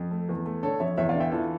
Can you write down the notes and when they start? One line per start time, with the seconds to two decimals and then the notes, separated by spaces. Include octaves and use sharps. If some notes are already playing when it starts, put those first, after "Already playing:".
Already playing: F2
0.11 A3
0.29 E2
0.46 A3
0.63 D3 A4 C#5
0.80 F2 C#5 E5
0.97 E2 C#5 E5
1.09 D5 F5
1.15 D3
1.20 E5 G5
1.32 E3 F4 A4